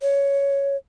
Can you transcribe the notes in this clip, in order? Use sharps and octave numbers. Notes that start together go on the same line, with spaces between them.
C#5